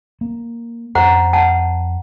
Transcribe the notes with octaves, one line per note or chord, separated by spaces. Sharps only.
A#3
F2 C5 F#5 A#5
F#5 A5